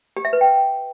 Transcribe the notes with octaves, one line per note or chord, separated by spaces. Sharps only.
G4
E5
B4
G5